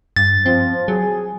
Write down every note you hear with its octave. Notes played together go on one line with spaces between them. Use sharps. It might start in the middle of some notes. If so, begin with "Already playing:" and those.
G2 A6
F3 C4
F#3 G#4